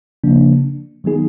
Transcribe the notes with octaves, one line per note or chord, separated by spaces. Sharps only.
C#3 F3 A#3 D4
D#3 F#3 B3 D#4 G#4